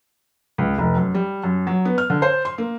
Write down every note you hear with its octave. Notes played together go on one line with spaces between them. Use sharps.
C#2
F1
F#2
G3
F#2
F#3
B3
F6
D3
C5
C6
A#3